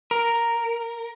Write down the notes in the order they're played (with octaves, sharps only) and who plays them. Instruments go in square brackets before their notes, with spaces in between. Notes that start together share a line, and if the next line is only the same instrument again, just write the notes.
[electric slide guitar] A#4